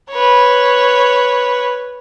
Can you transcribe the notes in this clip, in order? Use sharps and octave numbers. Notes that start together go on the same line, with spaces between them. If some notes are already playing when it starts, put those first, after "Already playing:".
B4 C#5